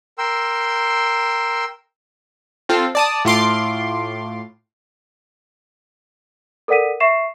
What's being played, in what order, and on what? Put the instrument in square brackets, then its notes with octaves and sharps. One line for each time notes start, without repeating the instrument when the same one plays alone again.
[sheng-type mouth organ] A#4 G5 C6 E6
[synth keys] C4 F4 A4
D5 A5 D#6
A2 F4 C6 D6
[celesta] A4 A#4 D5 F#5 B6 D#7
E5 C#6 C7 E7